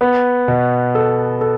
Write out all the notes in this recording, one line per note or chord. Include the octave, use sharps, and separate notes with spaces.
B3
B2
A4
A4